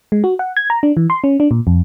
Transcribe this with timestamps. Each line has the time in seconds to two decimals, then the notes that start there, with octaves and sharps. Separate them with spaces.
0.12 G#3
0.24 F#4
0.39 F#5
0.57 G#6
0.70 A#5
0.83 D4
0.97 E3
1.10 C6
1.24 C#4
1.40 D4
1.51 A#2
1.67 F2